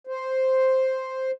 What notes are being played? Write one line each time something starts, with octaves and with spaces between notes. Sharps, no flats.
C5